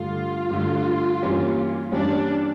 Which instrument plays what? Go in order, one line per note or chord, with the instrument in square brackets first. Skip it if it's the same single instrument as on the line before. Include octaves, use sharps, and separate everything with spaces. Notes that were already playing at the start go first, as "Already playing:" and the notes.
Already playing: [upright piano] G2 D3 A3 [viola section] F4
[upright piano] G2 D3 A3
G2 E3 A#3 C#4 G4
[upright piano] G2 E3 A#3 C#4 G4 [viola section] D4